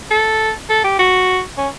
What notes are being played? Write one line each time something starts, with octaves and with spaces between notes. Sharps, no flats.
A4
A4
G4
F#4
C#4